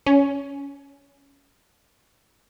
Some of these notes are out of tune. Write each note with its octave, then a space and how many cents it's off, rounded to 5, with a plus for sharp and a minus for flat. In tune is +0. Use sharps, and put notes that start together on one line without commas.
C#4 +20